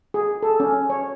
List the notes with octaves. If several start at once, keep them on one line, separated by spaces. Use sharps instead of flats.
G#4
A4
C#4
C#5